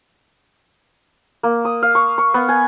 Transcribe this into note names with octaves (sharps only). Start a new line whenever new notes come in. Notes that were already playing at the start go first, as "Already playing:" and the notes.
A#3
D#6
F5
C#6
C#6
B3
G#5